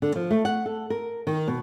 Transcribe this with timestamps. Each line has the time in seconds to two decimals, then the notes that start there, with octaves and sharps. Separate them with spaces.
0.02 D3
0.16 F3
0.31 A3
0.45 F#5
0.66 A4
0.90 A#4
1.27 D#3
1.48 B2